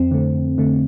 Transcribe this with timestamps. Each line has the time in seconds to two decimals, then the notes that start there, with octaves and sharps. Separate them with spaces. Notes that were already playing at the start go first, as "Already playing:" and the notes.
Already playing: F2 C4
0.11 D3 A3
0.34 F2
0.58 D3 A3